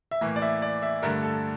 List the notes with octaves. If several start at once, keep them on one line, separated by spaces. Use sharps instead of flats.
E5
A2 E3 A#3
D5
E5
D5
E5
G2 D3 A3 A#4
A4